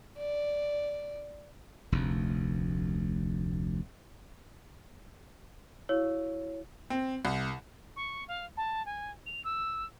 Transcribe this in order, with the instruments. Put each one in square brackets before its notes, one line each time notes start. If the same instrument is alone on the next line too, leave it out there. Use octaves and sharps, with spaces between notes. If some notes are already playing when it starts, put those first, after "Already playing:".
[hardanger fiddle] D5
[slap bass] F1 D2
[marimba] E4 F#4 F5 [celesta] C#5
[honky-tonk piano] C4
C2
[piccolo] C#6
F5
A5
G#5
F7
E6